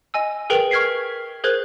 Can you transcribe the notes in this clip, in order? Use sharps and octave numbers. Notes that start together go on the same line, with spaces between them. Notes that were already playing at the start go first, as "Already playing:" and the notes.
D#5 G#5 E6
G#4 A#4 B4 G5 F7 F#7
C#6 F6 G#6 B6 C7
G#4 A#4 C5 F#6 G#6